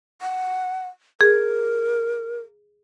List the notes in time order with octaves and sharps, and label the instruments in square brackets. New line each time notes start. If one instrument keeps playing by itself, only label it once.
[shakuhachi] F#5
[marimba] G#4 [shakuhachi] A#4